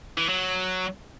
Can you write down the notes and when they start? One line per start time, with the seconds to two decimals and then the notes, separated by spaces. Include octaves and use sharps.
0.18 E3
0.29 F#3